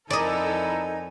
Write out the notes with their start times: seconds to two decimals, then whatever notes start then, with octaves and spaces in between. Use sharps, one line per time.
0.10 F2 D#4 E4 A4 A#4 D5 D#5 G#5